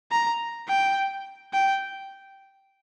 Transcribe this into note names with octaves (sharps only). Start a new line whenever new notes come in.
A#5
G5
G5